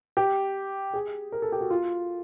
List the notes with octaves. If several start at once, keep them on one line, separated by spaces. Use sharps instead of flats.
G4
G#4
A#4
A4
G4
F#4
F4